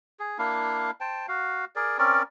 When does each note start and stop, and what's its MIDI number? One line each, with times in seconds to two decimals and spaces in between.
0.19 0.38 68
0.39 0.91 58
0.39 0.91 62
0.39 0.91 64
0.39 0.91 77
1.00 1.26 72
1.00 1.26 79
1.00 1.26 81
1.28 1.65 66
1.28 1.65 77
1.76 1.98 68
1.76 1.98 70
1.76 1.98 74
1.98 2.22 60
1.98 2.22 61
1.98 2.22 70
1.98 2.22 74